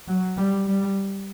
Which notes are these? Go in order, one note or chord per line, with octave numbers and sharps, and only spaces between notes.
F#3
G3
G3